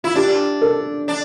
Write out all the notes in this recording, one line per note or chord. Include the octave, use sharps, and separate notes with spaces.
E4 F4
D4 G4
A4
D4